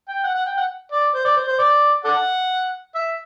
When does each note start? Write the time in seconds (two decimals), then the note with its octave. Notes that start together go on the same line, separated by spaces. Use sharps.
0.08 G5
0.24 F#5
0.34 F#5
0.46 G5
0.57 F#5
0.92 D5
1.15 C5
1.25 D5
1.36 C5
1.48 C5
1.59 D5
2.04 A4 D5 F#5
2.95 E5